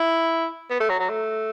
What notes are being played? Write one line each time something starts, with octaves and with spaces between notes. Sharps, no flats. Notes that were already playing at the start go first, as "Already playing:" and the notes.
Already playing: E4
B3
A3
F#3
F#3
A3